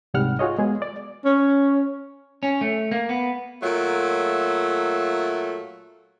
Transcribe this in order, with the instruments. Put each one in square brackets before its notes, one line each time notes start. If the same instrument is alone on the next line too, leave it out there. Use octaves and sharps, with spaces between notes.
[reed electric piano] C2 G#2 G3 F#5 F6
F4 F#4 G#4 C#5 D#5
G#3 B3 G#4
D5
[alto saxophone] C#4
[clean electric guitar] C#4
A3
A#3
B3
[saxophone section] A#2 F#3 A3 F4